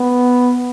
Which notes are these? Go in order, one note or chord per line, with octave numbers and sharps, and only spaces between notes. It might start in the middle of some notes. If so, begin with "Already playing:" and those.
Already playing: B3